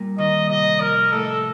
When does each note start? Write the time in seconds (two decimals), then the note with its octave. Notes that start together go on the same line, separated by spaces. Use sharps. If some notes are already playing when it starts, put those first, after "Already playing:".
Already playing: A#2 G3
0.18 D#3 D#5
0.49 C3 D#5
0.81 F3 A#4
1.12 A2 A4